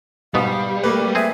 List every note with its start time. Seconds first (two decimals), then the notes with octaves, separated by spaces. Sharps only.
0.34 G#2 B2 G3 B3 F5
0.83 A3 A#3 B4 D6
1.15 C4 G#4 E5